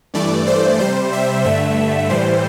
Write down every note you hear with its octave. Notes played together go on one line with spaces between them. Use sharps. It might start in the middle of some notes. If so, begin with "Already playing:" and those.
G2 E3 A3 D5
C5
C3 G3 C5
E5
G2 D3 A3 E5
A2 E3 G3 C5